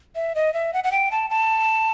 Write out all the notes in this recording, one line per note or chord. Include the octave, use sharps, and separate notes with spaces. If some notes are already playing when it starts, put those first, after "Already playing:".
E5
D#5
E5
F#5
F#5
G5
A5
A5